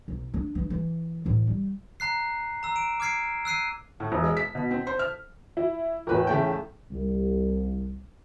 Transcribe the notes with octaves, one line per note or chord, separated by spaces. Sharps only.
B1
D4
E3 D4
E3 E4
A2 E3
G3
A#5 F#6 C7
A#5 E6
D7 E7
D6 F6 G#6 C7 D7
E6 F#6 C7 D#7
A2
E1
G#3
B6
B2
C4
C5
F6
E4
E2 A2 A#4 B4
C#3 A3 G5
C2